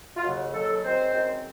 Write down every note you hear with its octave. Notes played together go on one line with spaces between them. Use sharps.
F4
D#2 C#3 F#3 F#4
D#2 C#3 F#3 A4
F#2 D#3 G#3 C4 C5
F#2 D#3 G#3 C4